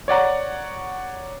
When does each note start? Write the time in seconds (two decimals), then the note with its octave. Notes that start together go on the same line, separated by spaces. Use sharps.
0.08 C#5 D5 F#5 A#5